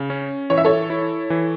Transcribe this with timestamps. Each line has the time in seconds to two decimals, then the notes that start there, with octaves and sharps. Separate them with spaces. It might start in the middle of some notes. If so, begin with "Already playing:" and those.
Already playing: C#3
0.10 C#4
0.50 E3 C#5
0.58 E5
0.65 A4 C#5
0.90 E4
1.30 E3